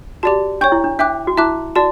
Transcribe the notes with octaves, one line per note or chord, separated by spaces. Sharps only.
F#4 G4 D5 A5
D4 C#5 G5 C#6 G6
E4
D4
D4 E5 G5 D6 F#6
F#4
E4 E5 A5 D6 F#6
F#4 D5 A5